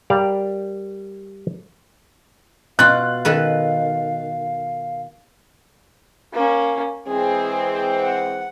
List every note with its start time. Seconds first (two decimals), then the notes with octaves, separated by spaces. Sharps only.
0.10 G3 G4 A#4 D5 F5
2.79 B2 F4 F5 F#6 A6
3.25 D#3 A4 B4
6.33 A#3 C#4
7.07 E3 G#3 C4 G#4
8.01 F#5